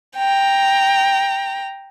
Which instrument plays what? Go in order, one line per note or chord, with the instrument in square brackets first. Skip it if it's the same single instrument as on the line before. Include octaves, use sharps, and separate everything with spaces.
[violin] G5 A#5